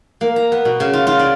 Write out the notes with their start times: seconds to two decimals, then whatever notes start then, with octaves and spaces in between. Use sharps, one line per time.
0.21 A#3
0.36 A#5
0.52 B3
0.65 B2
0.80 C#3
0.93 F4
1.07 F4
1.19 D5